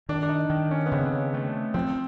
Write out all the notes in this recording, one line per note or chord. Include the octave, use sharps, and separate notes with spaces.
D#3 D4
D4
D#4
D#3
C#4
B3
C#3 C4
A3
F3 C4